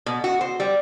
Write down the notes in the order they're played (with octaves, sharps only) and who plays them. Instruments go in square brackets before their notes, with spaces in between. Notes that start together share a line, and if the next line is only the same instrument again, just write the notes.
[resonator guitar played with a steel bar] B2
F#4
C5
G3